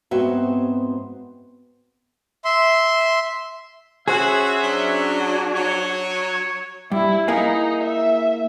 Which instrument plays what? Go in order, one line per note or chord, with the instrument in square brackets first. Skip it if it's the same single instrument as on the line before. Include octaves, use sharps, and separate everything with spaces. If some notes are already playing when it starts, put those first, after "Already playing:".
[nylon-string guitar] G#2 B3 C4 F#4 C#5 E5
[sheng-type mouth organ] E5 C6
[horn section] C#4 E5 [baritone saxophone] F#4 [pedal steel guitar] G#4 C5 F#5
[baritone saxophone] F#3 [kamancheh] D4 F#4
[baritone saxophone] F#3 [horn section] C#5
[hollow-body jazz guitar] G2 [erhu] E4
[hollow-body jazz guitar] A#3 E4 G#4 [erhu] D#4
[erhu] E5